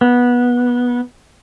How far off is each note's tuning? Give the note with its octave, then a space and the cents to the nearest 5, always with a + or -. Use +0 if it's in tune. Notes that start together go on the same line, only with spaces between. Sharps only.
B3 -15